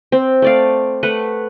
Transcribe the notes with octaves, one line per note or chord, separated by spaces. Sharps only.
C4
A3 D5 F5
A3 B4 F#5